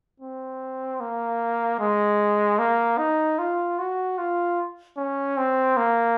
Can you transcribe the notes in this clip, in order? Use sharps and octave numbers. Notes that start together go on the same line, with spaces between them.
C4
A#3
G#3
A#3
D#4
F4
F#4
F4
C#4
C4
A#3